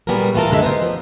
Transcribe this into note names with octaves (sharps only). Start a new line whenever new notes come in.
A#2 G3 B3 F#4 G#4 A#4
E3 B3 F4 F#4 A4 A#4
F#2 D3 G#3 A4 E5
B3 D#4 G4 A#4 C5
F3